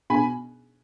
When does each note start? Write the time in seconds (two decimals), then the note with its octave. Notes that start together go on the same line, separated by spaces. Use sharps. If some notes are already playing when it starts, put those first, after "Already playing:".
0.10 B2 G#5 B5